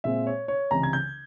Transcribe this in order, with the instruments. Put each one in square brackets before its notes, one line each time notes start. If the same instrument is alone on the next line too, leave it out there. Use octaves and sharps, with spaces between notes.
[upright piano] A#2 G#3 C4 E5
C#5
C#5
C#2 C3 E3 A#5
G#6
G6